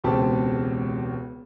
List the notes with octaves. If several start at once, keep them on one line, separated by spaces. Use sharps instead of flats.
E1 C#2 B2 C4 G4 A5